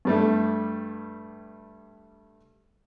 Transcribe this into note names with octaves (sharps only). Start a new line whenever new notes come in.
G2 G3 A3